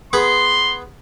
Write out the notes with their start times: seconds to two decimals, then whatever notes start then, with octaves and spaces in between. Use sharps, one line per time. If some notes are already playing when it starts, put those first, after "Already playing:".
0.13 B3 G#4 B5 C6